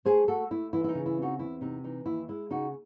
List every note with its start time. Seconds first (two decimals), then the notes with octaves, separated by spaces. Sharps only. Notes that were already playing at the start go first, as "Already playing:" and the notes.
0.05 A3 G#4 C5
0.28 A3 F#4 A4
0.51 A3 E4
0.73 E3 E4
0.84 E4
0.89 D#4
0.95 C#3
1.06 E4
1.18 C4 D#4 F#4
1.39 E2 E4
1.61 C3 D#4
1.84 E3 D#4
2.06 D#2 E4
2.28 G#3 E4
2.50 C#3 D#4 F#4